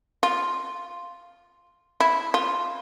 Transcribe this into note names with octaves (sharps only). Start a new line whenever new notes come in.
F4
E4
F4